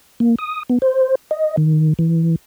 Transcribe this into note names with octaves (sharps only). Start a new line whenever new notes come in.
A#3
D#6
B3
C5
D#5
D#3
E3